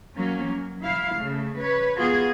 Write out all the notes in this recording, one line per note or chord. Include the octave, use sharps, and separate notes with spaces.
F#3 A#3 C#4
F#3
E4 F5
C#3 A3
B4 C#5
B3 F4 F#4 G#4